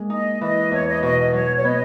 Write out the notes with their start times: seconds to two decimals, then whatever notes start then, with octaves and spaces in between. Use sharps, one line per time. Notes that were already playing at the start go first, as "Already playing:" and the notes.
Already playing: G#3 A#3
0.10 D#4 D#5
0.41 E3 D#5
0.72 E2 C#5
0.87 D#5
1.03 B2 D#5
1.18 D#5
1.33 F#3 C#5
1.56 C#5
1.64 B3 D#5